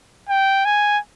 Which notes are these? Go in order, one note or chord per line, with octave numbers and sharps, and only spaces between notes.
G5
G#5